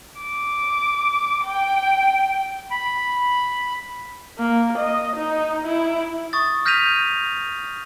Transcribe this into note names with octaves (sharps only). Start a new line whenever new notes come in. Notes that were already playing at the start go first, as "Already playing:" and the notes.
D6
G5
B5
A#3
D#5
D#4
E4
C#6 D#6 A6
F6 G6 A#6 B6 D#7 F7